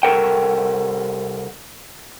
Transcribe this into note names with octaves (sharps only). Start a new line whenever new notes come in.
C2 F2 A4 A#4 F#5 G5